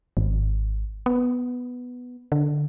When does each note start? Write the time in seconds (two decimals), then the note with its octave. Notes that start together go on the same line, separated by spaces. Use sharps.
0.17 G#1
1.06 B3
2.32 D3